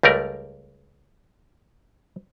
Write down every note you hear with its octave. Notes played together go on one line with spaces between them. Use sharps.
C#2 G3 A3 A#4 D5